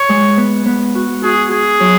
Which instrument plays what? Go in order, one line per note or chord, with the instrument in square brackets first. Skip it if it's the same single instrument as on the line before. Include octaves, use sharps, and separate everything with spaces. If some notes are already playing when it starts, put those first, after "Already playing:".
Already playing: [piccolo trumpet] C#5
[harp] G#3
B3
B3
F#4
[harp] F#4 [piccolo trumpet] G#4
[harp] F#4 [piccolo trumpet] G#4
[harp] F#3